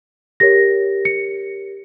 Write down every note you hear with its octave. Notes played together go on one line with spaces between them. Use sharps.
G4 A#4 C#5 A#6
C#7